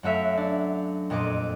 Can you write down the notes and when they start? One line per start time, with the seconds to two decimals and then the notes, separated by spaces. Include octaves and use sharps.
0.03 F#2 A3 F#4 E5 F5 B6
0.37 D4
1.10 F2 A#2 D#5 D6